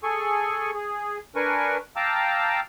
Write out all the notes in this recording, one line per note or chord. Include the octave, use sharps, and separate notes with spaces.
G#4 A4 G#5 C#6
G#4
D4 A#4 B4 G#5 C#6
F5 G5 A5 A#5 D6 E6